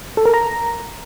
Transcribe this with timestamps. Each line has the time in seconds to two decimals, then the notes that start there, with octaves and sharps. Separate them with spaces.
0.17 A4
0.25 A#4
0.34 A#5